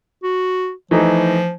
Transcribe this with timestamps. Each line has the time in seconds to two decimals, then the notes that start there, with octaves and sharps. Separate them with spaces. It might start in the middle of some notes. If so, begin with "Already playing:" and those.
0.23 F#4
0.91 E3 F3 A3 D#4